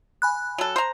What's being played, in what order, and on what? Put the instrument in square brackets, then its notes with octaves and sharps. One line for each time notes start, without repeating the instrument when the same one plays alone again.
[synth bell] G#5 B5 F#6
[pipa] F#3 A4
C5 A#5